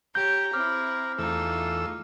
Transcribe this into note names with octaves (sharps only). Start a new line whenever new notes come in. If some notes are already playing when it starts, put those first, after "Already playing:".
G4 C#5 A#5 G6
C4 E4 D6 F6
E2 A3 D#4 F4 E6